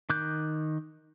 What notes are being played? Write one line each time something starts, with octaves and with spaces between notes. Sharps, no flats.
D#3 D6 F#6 G6